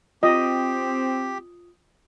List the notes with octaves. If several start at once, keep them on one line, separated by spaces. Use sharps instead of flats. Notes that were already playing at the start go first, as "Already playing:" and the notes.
C4 F4 G4 D#5 D#6